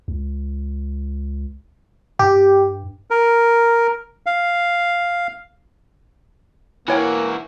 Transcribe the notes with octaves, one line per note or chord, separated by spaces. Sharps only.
C#2
G2 G4
A#4
F5
E3 A#3 E4 F#4 C#5 G5 G#5